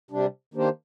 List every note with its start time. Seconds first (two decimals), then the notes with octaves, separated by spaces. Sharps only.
0.11 C3 G3 D4
0.54 D#3 A#3 D4 G4 C5